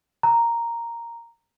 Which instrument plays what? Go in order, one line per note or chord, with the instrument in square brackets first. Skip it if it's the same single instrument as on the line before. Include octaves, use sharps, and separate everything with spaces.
[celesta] A#5